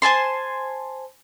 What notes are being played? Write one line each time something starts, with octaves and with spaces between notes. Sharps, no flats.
C5 G#5 A5 C6